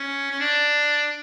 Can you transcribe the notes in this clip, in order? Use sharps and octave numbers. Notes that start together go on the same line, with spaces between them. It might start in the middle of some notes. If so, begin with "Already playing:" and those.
Already playing: C#4
C#4
D4